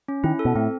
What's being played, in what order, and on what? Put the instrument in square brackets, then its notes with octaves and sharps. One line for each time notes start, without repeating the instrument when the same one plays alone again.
[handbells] C#4
[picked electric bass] D#3 [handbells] E4
[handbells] A4
[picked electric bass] B2
[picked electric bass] A2 [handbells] C4